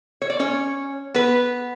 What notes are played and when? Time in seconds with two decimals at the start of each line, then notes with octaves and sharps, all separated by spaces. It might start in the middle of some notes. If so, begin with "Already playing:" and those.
0.22 C#5
0.30 D5
0.39 C#4 C#5
1.14 B3 B4